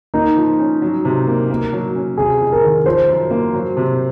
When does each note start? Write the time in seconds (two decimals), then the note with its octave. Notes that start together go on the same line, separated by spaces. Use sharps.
0.14 A#3 D#4
0.37 F3
0.59 C#4
0.82 F#3
1.05 C3
1.27 A#3
1.50 A#3
1.73 F#3
1.95 C#4
2.18 C3 G#4
2.41 F2
2.52 A#4
2.63 D#3
2.86 F3 C5
3.08 F#2
3.31 A#3
3.54 F#3
3.77 C3